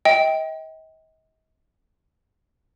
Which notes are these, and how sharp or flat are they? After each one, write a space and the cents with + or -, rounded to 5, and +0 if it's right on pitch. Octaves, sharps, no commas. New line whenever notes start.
D#5 +40 G5 +0